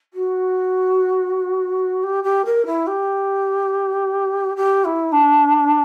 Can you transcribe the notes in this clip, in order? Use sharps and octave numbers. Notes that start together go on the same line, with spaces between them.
F#4
G4
G4
A#4
E4
G4
G4
E4
D4